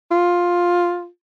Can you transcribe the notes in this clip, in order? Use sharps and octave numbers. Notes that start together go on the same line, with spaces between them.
F4